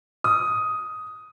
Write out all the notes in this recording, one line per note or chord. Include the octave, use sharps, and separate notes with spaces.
D#6